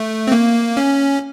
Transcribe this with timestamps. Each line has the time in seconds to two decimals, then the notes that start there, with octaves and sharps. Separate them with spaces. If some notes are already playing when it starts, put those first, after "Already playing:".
Already playing: A3
0.27 C4
0.32 A#3
0.77 C#4